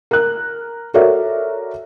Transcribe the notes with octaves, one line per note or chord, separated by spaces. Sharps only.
A#4 F#6
F#4 A4 A#4 C#5 D5 E5